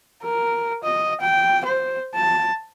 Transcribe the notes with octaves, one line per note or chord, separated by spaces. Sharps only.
A#4
D#5
G5
C5
A5